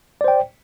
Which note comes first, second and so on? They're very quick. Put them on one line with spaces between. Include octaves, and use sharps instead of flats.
D5 C5 G5